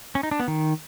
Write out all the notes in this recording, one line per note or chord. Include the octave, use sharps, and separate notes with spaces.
C#4
D#4
D4
B3
D#3